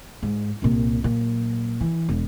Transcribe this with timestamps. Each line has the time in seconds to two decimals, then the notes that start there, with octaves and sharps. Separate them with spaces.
0.23 G#2
0.62 C2 A#2
1.04 A#2 F#3
1.81 E3
2.09 E1